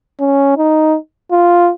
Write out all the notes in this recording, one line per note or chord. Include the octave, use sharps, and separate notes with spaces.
C#4
D#4
F4